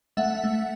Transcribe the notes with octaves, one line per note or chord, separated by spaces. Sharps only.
A3 E5 F#5
A3